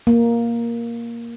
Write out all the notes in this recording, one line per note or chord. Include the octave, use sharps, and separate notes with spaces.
A#3